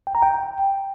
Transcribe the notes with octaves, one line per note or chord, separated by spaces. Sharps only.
G5
A#5
G5